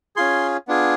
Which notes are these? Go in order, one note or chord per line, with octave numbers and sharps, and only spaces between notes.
C#4 F4 G#4 C6
B3 D4 F4 G#4